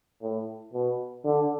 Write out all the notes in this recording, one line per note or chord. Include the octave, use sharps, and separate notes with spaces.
A2
B2
D3